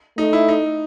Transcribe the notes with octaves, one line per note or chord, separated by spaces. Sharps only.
A3 D#4
E4
D#4